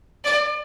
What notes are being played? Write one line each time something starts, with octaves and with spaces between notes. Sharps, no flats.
D5